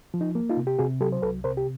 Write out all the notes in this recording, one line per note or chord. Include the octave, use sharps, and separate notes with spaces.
F3
D#4
A#3
D#4 F4
C3
G4
C3 F#4 G#4
F#3 G4 A4
C5
C2 A4 B4
C3 A#4 C5
G4